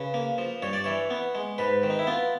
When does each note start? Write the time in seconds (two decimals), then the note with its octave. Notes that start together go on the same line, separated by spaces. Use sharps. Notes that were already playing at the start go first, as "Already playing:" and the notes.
Already playing: C#3 B4
0.14 A#3
0.38 F3
0.62 G2 C#5
0.73 D5
0.84 E3 C#5
1.10 B3
1.35 G#3
1.58 G#2 B4
1.83 D#3
1.90 D#4
1.99 E4
2.07 B3 F4